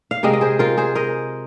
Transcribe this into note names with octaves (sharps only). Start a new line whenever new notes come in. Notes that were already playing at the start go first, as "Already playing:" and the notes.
F5
C3 G#3 C4 A#4 D#5
D#5
G#4 C5
F4 A#4
G#4 C5
A#4 D#5